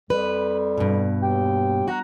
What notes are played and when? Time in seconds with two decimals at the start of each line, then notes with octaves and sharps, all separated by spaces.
0.10 F2 G3 B4
0.78 G2 B2
1.22 D#2 G4 G5
1.88 F#4 F#5 A#5